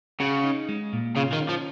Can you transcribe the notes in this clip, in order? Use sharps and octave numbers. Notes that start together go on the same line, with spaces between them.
C#3 F#4
D#4
G#3
A#2
C#3 F4
D#3
C#4
F3